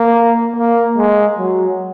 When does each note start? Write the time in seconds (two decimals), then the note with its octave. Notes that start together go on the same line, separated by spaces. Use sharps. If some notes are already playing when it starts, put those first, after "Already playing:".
Already playing: A#3
0.56 A#3
0.97 G#3
1.38 F#3